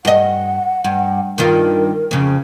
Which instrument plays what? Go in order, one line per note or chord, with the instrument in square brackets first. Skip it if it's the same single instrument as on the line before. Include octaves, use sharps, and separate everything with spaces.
[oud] G2 D#5 [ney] F#5
[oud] G2
[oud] G2 D#3 F4 [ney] A#4
[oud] F2 C#3